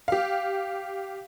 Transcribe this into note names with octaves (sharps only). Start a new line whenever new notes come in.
G4 F5